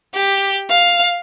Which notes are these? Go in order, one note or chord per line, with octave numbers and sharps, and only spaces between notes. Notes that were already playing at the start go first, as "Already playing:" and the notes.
G4
F5